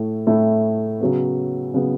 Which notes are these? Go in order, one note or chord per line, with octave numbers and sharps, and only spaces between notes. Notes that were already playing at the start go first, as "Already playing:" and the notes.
Already playing: A2 A3 E4
A2 A3 E4
C#3 F#3 B3
C#3 F#3 B3